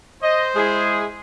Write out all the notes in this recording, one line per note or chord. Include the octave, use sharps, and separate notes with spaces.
C5 D#5
G#3 E4 G#4